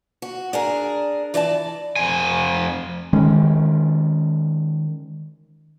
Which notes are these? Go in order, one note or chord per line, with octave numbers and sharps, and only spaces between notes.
F#4
D4 G#4 A#4
E3 D5 D#5 A5
F2 G#5
D#3 G#3 C#4